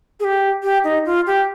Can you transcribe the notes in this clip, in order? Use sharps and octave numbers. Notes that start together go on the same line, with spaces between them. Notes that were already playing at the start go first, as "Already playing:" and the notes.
G#4
G4
G4
D#4
F4
G4